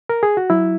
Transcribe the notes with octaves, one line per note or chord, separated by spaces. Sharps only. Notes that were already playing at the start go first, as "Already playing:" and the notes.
A#4
G#4
F#4
F#3 E4